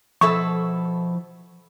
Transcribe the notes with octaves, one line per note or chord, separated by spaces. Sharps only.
B2 F3 E4 A4 C#6